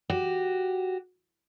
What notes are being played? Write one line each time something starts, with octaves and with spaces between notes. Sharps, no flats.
F#4 G4